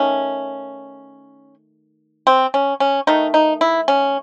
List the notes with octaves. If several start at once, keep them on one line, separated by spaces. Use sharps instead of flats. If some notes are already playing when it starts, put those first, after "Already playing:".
Already playing: D#3 A3 C#4
C4
C#4
C#4
D#3 A3 D#4
D#4
E4
C#4